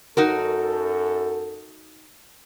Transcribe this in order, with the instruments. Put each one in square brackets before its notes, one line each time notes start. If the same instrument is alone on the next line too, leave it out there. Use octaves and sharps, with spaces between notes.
[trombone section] F#2 A4 [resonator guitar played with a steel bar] D#4 F#4 A#4